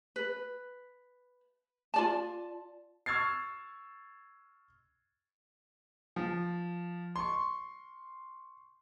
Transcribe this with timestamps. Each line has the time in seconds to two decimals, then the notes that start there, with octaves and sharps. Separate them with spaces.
0.16 B4
1.94 F4 D5 A5
3.06 C#6 E6 F6 G#6 A6 C7
6.16 F3
7.16 C6 C#6